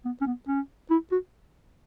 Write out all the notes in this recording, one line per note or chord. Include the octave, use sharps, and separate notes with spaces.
B3
C#4
B3
C#4
E4
F#4